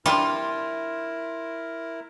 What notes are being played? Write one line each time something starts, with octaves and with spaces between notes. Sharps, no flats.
G3 C4 D4 E4 F4 A#4